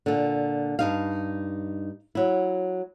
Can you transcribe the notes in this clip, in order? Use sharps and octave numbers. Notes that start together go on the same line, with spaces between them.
A#2 D3
G2 D#4 F5
F#3 E4